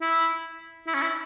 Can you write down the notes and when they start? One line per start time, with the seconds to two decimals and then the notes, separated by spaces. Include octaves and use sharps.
0.02 E4
0.87 E4
0.94 C#4
1.02 E4